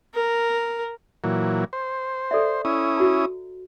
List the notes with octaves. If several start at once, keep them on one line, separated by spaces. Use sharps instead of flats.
A#4
A#2 E3 F#3
C5
A4 D5 E5
C#4 E4 D#6
F#4 A#5